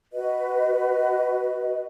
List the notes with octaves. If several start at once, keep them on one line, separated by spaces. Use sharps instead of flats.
F#4 B4 D#5